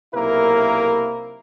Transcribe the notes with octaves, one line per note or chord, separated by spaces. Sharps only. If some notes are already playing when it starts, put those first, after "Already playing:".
B1 C3 A#3 E4 A#4